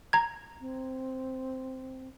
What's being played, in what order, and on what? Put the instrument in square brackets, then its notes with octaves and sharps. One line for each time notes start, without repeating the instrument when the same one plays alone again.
[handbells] A#5 G#6
[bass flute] C4